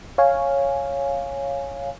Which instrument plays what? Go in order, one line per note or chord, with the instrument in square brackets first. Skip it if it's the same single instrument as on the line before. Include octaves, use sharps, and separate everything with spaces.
[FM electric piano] C#5 F5 G#5